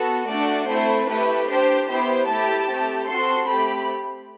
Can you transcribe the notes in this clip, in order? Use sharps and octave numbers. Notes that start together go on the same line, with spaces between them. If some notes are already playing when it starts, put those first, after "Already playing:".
Already playing: B3 F#4 A4
A3 D4 F#4 D5
A3 C4 E4 C5
A3 E4 G4 B4
D4 G4 C5
B3 E4 G4 C5
A3 E4 G4 A5
A3 C4 G4
C4 F#4 A4 C6
A3 C4 G4 B5